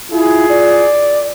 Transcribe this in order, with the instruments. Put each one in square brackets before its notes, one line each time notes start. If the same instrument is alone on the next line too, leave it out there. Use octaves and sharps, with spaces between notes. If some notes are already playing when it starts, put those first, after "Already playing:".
[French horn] E4 [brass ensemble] F4 G#4
[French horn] D5